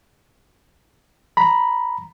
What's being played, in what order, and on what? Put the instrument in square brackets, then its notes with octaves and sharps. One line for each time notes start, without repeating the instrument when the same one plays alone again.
[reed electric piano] A#5 B5